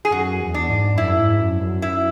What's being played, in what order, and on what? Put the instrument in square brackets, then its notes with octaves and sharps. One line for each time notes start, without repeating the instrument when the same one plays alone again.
[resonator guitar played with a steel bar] G#4
[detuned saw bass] F#2 [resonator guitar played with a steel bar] F#4
[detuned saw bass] E2
[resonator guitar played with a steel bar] D4
[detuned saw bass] G#2
[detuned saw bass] F#2 [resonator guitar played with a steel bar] E4
[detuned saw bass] G#2
F#2
F#2
[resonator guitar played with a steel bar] E4